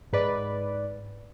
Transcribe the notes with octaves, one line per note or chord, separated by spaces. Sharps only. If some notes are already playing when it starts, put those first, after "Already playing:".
G#2 B4 D5